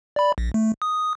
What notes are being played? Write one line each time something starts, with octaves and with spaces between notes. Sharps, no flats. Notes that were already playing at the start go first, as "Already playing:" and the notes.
D5 B5
A#1
A3
D#6